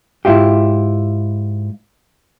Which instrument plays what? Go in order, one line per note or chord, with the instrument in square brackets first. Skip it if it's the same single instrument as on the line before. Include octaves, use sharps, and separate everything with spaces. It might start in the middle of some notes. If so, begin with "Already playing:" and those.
[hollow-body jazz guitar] G#2 E4 F4 G4